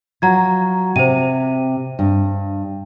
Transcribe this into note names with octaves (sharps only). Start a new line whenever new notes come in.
F3 F#3 F#5 A#5 G#6
C3 C5 D#7
G2